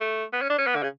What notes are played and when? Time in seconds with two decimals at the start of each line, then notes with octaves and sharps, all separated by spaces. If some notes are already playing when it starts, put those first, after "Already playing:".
0.01 A3
0.33 B3
0.42 C#4
0.50 D4
0.58 C#4
0.67 B3
0.75 D3
0.83 C#3